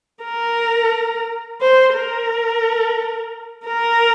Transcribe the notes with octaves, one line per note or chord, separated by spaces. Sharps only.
A#4
C5
A#4
A#4